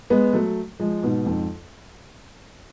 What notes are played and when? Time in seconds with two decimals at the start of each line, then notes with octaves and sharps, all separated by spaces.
0.10 G#3 B3
0.33 F#3 A3
0.80 F3 G#3
1.03 G#2 B2
1.26 F2 G#2